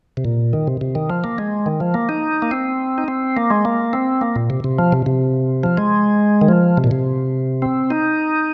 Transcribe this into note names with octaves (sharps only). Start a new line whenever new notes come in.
C3
A#2
D#3
C3
C3
D#3
F3
A#3
G#3
D#3
F3
A#3
D#4
A#3
C4
D#4
C4
A#3
G#3
A#3
C4
A#3
A#2
C3
C3
F3
C3
C3
F3
G#3
D#3
F3
C3
A#2
C3
C4
D#4